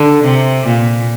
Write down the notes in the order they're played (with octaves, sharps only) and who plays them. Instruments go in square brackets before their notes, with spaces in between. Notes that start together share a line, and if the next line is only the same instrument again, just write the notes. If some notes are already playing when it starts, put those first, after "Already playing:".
Already playing: [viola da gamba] D3
C3
A#2